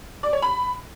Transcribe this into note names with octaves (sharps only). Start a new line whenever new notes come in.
D5
C#5
B5